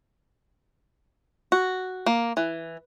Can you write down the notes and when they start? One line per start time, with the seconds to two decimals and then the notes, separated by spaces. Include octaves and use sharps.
1.52 F#4
2.06 A#3
2.37 E3